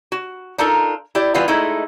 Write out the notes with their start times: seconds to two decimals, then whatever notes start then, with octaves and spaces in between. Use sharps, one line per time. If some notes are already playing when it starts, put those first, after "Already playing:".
0.12 F#4
0.58 D4 D#4 F4 A4 A#4
1.15 E4 G4 D5
1.34 E3 G3 B3 F4 F#4
1.48 G#3 A3 D#4 E4